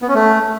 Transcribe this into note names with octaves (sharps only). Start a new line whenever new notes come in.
B3
C#4
A3